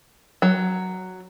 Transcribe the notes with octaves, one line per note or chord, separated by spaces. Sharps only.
F#3